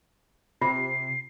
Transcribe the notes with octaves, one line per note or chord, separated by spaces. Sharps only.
C3 F4 C7